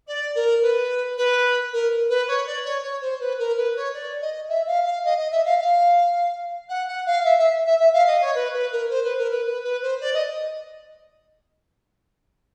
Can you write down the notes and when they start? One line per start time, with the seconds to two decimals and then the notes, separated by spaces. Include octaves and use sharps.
0.07 D5
0.35 A#4
0.62 B4
1.17 B4
1.73 A#4
2.09 B4
2.27 C#5
2.46 D5
2.64 C#5
2.83 C#5
3.01 C5
3.20 B4
3.38 A#4
3.56 B4
3.75 C#5
3.93 D5
4.21 D#5
4.48 E5
4.67 F5
4.85 F5
5.04 D#5
5.17 D#5
5.31 E5
5.45 F5
5.59 F5
6.69 F#5
6.87 F#5
7.06 F5
7.24 E5
7.38 E5
7.66 E5
7.79 E5
7.93 F5
8.07 D#5
8.21 C#5
8.34 B4
8.53 B4
8.72 A#4
8.90 C5
9.03 B4
9.17 A#4
9.31 B4
9.45 B4
9.63 B4
9.82 C5
10.00 D5
10.13 D#5